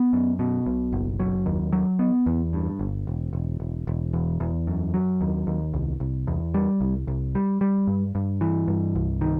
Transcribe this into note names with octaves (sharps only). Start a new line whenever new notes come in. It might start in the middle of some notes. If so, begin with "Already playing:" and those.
Already playing: B3
F#2
B2
B1
F#1
F#3
D#2
F#3
B3
E2
G2
G1
E1
E1
E1
E1
E2
E2
F#2
F#3
D#2
D#2
C2
C2
E2
G3
C2
C2
G3
G3
G2
G2
E3
G2
C2
D#3